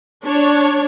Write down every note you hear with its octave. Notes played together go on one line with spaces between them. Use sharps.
D4 C#5